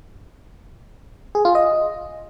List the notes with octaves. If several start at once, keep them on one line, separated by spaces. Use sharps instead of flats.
G#4
F4
D#5